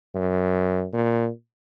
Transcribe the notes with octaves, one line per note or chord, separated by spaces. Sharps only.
F#2
A#2